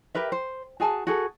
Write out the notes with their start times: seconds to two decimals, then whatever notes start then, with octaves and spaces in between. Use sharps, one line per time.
0.15 G4 A#4 B4 E5
0.32 C5
0.80 F#4 G#4 G#5 A5
1.07 F#4 G#4 A4